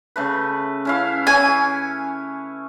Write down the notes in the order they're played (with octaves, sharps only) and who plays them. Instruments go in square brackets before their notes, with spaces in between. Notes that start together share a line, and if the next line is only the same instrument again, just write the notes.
[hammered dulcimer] C#3 A3 B4
C#4 E4 F5
[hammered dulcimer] C#4 [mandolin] G#5